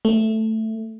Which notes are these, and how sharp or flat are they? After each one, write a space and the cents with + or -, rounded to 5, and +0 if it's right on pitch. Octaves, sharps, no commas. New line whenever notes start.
A3 +5